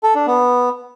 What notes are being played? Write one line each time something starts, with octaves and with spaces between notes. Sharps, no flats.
A4
D4
B3